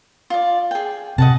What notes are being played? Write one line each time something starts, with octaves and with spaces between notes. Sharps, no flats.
F4 D5
G#4 G5
C3 D#5 F#5 A5